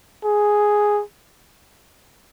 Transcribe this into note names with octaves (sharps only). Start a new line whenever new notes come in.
G#4